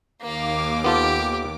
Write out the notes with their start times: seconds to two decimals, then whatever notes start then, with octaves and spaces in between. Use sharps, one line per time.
0.21 D#2 A#3 F5 D6
0.84 B3 F4 G4 A4